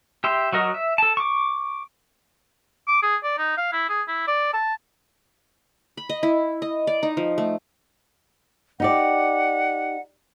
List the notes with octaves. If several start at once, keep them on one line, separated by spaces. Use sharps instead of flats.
G4 E5 C6
F#3 F#4 A#4 D#5
E5
A4 A5
C#6 D6
D6
G#4
D5
D#4
F5
E4
G#4
E4
D5
A5
B5
D#5
E4
D#5
D5
D#4
F3
A3
D#4 G4 D5 F#5